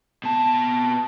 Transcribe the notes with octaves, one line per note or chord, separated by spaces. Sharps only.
B2 A5